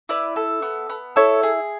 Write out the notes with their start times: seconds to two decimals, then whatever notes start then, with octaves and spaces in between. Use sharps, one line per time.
0.09 E4 B4 D5
0.36 A4
0.62 B3
0.89 B3
1.16 E4 A4 C#5
1.43 G#4